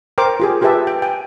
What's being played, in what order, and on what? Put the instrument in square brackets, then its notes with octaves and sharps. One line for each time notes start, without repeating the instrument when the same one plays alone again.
[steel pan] A#4 C5 G5 D6
F4 G4 G#4
F4 G4 G#4 B4 E5 A5
G5
G5 G#5